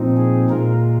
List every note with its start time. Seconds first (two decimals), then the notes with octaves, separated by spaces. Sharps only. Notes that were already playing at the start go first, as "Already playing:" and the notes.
Already playing: A#2 F3 C4 D#4
0.17 G#4
0.50 A#2 G#3 F4 A#4